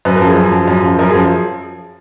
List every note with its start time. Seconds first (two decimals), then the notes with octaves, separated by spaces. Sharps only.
0.05 F#2 B4
0.16 A#4
0.21 F3
0.26 G#4
0.37 F#2
0.52 F3
0.68 F#2
0.83 F3
0.99 F#2 A#4
1.09 G#4
1.15 F3